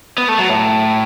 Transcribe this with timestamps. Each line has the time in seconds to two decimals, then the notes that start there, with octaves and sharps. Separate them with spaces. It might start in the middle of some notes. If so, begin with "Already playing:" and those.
0.18 B3
0.29 A3
0.39 F#3
0.50 A2